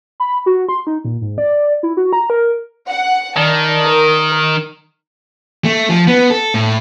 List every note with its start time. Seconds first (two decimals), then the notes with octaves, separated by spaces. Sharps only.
0.20 B5
0.46 F#4
0.69 C6
0.87 D#4
1.05 A#2
1.21 G#2
1.38 D5
1.83 E4
1.97 F#4
2.13 A#5
2.30 A#4
2.90 F#5
3.37 D#3 D5 A5
3.83 A#4
5.65 A3
5.89 F3
6.07 B3
6.30 A4
6.54 A2